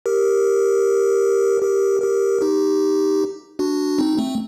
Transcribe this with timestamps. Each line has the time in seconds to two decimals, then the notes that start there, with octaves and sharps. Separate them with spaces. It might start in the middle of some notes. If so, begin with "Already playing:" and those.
0.06 G4 A#4
1.62 G4 A#4
2.01 G4 A#4
2.42 D#4 G4
3.59 D4 F#4
3.98 C4 D#4
4.18 A3 C4